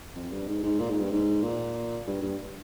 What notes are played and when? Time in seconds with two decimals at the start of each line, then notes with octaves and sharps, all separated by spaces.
0.16 F2
0.31 G2
0.47 G#2
0.63 G#2
0.79 A#2
0.90 G#2
1.00 G2
1.11 G#2
1.42 A#2
2.07 G2
2.22 G2